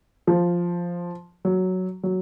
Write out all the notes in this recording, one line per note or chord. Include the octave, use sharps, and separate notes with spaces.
F3
F#3
F#3